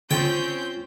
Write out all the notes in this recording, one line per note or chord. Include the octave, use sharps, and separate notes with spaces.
D3 C4 C#4 F4 G5 G6